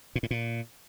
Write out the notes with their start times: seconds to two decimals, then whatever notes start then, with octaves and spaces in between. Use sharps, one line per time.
0.15 A#2
0.23 A2
0.31 A#2